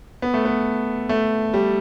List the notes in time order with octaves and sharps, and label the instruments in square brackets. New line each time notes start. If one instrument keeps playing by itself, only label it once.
[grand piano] B3
A3
B3
A3
G3